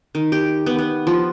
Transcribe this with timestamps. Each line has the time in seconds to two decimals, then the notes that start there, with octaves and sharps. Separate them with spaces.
0.15 D#3
0.32 G4
0.66 B3
0.78 B3
1.07 F3